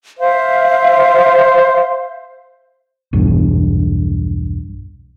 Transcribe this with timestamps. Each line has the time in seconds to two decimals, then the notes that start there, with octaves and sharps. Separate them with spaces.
0.19 C5 E5 F5
3.13 B1 E2 G2